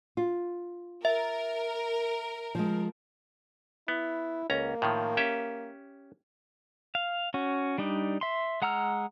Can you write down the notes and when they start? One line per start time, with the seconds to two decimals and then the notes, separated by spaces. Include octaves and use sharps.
0.17 F4
1.05 A#4 E5
2.55 F3 G#3
3.88 B3 E4
4.50 C#2 A#3 C#4 A#5
4.82 A2 D#3 F3
5.17 C#4 G4 E5
6.95 F5
7.34 C#4 F#4
7.78 G3 D4 D#4
8.21 E5 C6
8.62 G#3 F#5 A#5 E6 F6